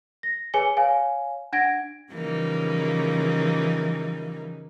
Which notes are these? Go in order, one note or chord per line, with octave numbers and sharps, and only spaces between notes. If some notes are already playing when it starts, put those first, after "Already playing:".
A#6
G#4 B4 C#5 G#5 C#7 G7
C#5 F5 G#5
D4 F#5 G#6 A#6 D7
C#3 E3 F3 G3 A#3 D#4